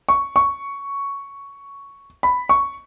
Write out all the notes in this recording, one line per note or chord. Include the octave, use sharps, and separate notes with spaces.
C#6
C#6
B5
C#6